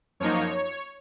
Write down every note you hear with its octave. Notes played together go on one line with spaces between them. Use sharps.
F#2 F3 A#3 D#4 C#5